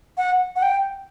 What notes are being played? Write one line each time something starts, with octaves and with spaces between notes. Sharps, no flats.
F#5
F#5
G5